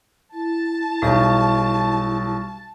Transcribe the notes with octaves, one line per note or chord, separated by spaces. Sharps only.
E4 A5
B1 G3 G4 C#6